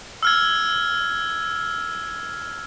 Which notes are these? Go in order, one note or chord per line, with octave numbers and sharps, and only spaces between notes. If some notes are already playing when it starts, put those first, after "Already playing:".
E6 F6 G#6